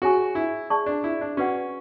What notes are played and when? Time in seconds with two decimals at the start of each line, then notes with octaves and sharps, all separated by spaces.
0.02 F#4 G#4 C#5 E5 G#5 C#6
0.35 E4
0.70 C#4 G#4 D5 A5 C#6
0.86 D4
1.04 E4
1.21 D4
1.37 C#4 F#4 B4 D5 F#5 C#6